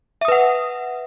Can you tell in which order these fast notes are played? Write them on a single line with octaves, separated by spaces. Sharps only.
E5 D#6 B4 F#5